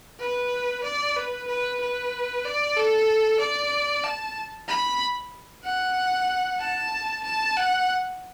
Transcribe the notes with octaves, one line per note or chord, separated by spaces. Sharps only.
B4
D5
B4
B4
B4
D5
A4
D5
A5
B5
F#5
A5
A5
F#5